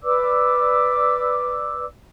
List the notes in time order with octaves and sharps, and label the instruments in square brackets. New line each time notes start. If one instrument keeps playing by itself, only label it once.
[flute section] B4 D5 D6 E6